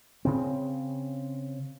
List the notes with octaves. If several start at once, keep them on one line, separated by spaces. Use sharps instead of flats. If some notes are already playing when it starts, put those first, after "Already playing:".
C#3 C4